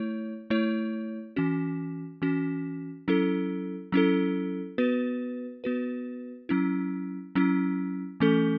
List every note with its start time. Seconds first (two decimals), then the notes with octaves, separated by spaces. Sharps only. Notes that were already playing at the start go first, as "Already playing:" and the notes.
Already playing: A3 E4 C#5
0.50 A3 E4 C#5
1.36 E3 C#4 F#4
2.22 E3 C#4 F#4
3.08 F#3 C#4 E4 A4
3.92 F#3 C#4 E4 A4
4.78 B3 F#4 B4
5.64 B3 F#4 B4
6.49 F#3 C#4 E4
7.35 F#3 C#4 E4
8.20 E3 A3 C#4 A4